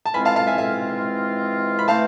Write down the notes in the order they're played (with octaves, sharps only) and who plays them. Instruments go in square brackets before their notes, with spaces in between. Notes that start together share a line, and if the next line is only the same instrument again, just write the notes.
[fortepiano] A5
[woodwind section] G#2 E3 G#3 C4 F4 [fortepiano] G#5 B5
[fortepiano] F5 A5
F5 A5
E5 G#5
E5 G#5
B5
[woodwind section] E3 A3 C4 [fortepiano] F5 A5